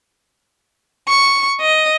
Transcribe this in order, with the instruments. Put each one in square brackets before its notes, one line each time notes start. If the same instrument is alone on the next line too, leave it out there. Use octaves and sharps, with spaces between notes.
[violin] C#6
D#5